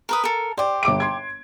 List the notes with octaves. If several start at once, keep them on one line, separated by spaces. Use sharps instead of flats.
A#4 B4 D#6
A4 A#4
G4 C5 D5
G1 D6 D7
C6 G#6